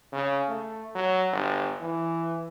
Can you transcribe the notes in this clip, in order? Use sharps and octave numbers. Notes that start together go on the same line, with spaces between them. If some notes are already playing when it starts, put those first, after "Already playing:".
C#3
A3
F#3
G1
E3